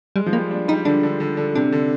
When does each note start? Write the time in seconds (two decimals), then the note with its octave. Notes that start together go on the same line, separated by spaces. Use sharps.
0.16 G3 G#3
0.26 F3
0.33 G3 A#3
0.51 D4
0.68 G3 D#4
0.85 D3 D4
1.03 D3
1.20 D3
1.37 D3
1.55 C3 D4
1.72 D3